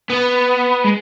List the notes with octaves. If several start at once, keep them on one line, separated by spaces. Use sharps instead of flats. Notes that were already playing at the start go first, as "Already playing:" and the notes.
B3
G#3